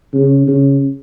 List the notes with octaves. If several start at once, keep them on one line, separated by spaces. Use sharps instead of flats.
C#3
C#3